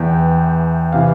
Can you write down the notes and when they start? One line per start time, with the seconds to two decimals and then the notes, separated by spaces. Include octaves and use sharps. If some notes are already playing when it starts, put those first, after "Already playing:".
Already playing: E2 E3 G5
0.93 C3 E3 F5